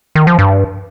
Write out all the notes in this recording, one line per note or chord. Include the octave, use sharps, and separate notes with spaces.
D#3
F3
G2